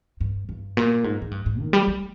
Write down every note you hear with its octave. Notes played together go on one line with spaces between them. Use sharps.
G2
G2
A#2
G#2
G#2
G2
G#2
D#3
G3
G3